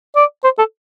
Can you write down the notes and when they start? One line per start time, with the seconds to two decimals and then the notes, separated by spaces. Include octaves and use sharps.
0.16 D5
0.44 C5
0.58 A4